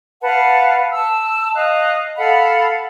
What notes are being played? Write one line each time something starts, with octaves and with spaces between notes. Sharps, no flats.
B4 F5 F#5 A5
A5 E6
D#5 F5 F#6
A4 F5 F#5 B5